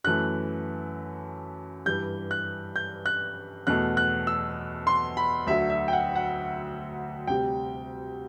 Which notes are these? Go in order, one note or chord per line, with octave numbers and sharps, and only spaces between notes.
F#2 E3 A3 F#6
G2 E3 G3 G6
F#6
G6
F#6
E2 B2 A3 F#6
F#6
E6
C6
B5
D2 D3 F#3 E5
E5
G5
F#5
F#5
D2 C3 G3 G5